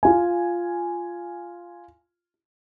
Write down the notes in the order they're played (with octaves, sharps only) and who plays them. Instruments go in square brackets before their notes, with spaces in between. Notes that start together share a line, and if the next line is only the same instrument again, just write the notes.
[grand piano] F4 G#5